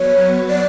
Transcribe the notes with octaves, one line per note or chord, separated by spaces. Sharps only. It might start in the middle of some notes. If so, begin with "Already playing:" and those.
Already playing: F#3 B3 F#4 B4 C#5
F#3
D5